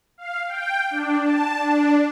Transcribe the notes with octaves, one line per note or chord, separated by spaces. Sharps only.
F5
G5
D4
A5
D4